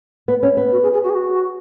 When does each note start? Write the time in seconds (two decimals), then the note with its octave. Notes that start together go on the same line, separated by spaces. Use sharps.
0.28 B3
0.43 C#4
0.57 B3
0.72 F#4
0.82 G#4
0.93 G#4
1.04 F#4
1.10 G#4
1.15 F#4